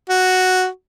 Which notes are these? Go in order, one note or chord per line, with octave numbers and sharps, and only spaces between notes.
F#4